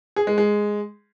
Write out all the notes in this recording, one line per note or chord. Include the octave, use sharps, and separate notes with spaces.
G#4
G#3
G#3